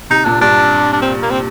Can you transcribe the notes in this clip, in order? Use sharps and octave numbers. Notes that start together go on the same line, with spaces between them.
C3 D#4
A#2 D4
G2 D4
D4
C4
A#3
C4